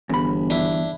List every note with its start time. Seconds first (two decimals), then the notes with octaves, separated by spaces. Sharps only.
0.09 G1 E2 B5
0.50 D4 E4